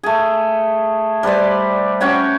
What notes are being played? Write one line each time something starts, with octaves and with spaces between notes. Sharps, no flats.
A3 G#4
G3 B4 C5 D5
C#4 F#4 C#5 G5